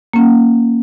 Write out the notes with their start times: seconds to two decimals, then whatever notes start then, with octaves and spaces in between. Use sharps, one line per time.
0.13 A#3 C#4